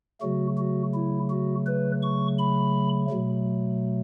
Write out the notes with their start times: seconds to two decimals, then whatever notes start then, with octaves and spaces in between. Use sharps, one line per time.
0.21 C#3 F#3 A3 F#4
0.58 F#4
0.94 E4
1.30 F#4
1.66 B4
2.02 C#6
2.38 B5
3.10 B2 F#3 A3